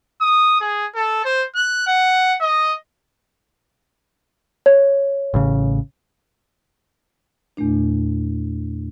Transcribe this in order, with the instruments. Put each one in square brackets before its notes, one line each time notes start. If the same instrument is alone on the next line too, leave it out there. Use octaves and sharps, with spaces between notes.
[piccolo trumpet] D#6
G#4
A4
C5
F#6
F#5
D#5
[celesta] C#5
[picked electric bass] A1 C#3
[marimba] E2 A#2 A3 D4